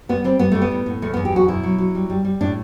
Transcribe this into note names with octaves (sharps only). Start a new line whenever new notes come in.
G3 B3
G3 C4
G3 B3
G3 A3
B3
A2
A2
E2 A3
B3
E2
G4
F#3 F#4
B2 E4
F#3
F#3
G3
G3
G3
A2 D4